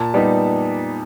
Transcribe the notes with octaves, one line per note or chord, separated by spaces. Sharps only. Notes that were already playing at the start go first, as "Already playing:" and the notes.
Already playing: A#2 A5
G3 B3 D#4